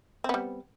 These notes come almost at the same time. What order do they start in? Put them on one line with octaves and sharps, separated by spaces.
C4 B3 G3